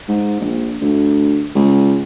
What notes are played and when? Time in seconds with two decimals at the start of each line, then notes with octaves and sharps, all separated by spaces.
0.08 G#2
0.40 A#1
0.82 D2
1.55 C#2